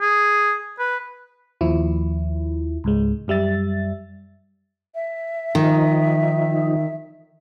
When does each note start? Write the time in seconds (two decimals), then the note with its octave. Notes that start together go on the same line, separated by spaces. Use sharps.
0.01 G#4
0.79 B4
1.61 D#2 F3 E4
2.84 C#2 G#2 G#3
3.28 F#2 G3 E5 A6
4.94 E5
5.55 D#3 F3 D#4